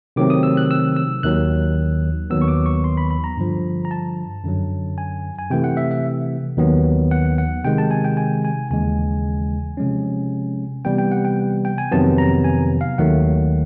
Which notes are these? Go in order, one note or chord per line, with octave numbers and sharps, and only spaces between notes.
C3 D#3 F#3 A3 C4 D6
D#6
E6
F#6
E6
E6
D#2 D#3 F#3 F#6
D#2 D#3 F#3 B3 E6
C#6
D6
C#6
C6
B5
B5
A#5
G2 D3 F3
A#5
A5
F#2 D3 F#3
G#5
G#5
C3 E3 A3 G5
F#5
E5
E5
D#2 D#3 F#3 B3
F#5
F#5
C3 D#3 G#3 G5
A5
G#5
G5
G#5
G#5
D#2 C#3 E3 G#3 G#5
C3 F3 G#3 C#4
C3 E3 G3 B3 G5
G5
F#5
G5
G5
G#5
F2 C3 D#3 F#3 B3 A5
A#5
G#5
F5
D#2 D#3 F#3 A3 F#5